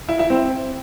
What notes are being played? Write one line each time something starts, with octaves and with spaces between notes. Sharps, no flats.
E4
E4
C4